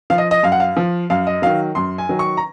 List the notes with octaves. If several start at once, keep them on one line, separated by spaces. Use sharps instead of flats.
F3 F5
D#5
D#5
F#2 F5
F#5
F5
F3
F#2 F5
D#5
D#3 F#3 F5
F#2 C6
G#5
D#3 F#3
C#6
A#5